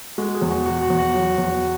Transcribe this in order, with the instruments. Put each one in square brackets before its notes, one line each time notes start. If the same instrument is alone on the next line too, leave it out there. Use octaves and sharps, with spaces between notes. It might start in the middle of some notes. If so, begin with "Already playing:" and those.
[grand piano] G#3 [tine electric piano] F#4
[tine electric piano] G#4
[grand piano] E2
[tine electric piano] F#4
[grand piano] B2 [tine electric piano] F#4
[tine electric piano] F#4
[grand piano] E2
[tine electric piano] F#4
[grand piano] F#3
E2